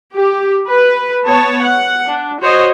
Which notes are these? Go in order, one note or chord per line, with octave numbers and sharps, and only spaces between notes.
G4
B4
B3 C#5 A5
F#5
D4
F#4 C5 C#5 D#5